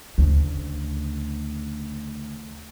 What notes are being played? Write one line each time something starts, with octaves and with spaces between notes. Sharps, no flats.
D2 C#3